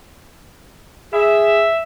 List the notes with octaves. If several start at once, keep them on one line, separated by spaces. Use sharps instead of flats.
G#4 E5